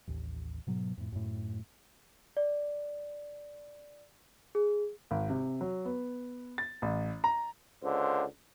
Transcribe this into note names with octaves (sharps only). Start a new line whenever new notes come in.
A1 D#2
G#2 B2 F#3
F2 A2
F#2 A2
D5
G#4
G#1
C3
F#3
B3
A6
A1
A#5
C#2 D3 C5